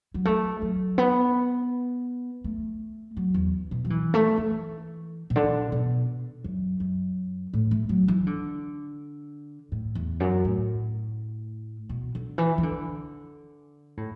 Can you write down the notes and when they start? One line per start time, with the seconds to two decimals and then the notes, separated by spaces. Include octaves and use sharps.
0.14 F#3
0.25 A3
0.62 F#3
0.98 B3
2.44 A3
3.17 F#3
3.34 E2
3.71 B2
3.85 F#3
3.90 E3
4.14 A3
4.37 E3
5.30 B2
5.36 D3
5.72 B2
6.44 F#2
6.80 F#2
7.53 A2
7.71 A3
7.89 F#3
8.08 E3
8.27 D3
9.72 A2
9.95 E2
10.20 F#2
10.45 A2
11.89 B2
12.15 D3
12.38 E3
12.58 E3
12.63 D3
13.97 A2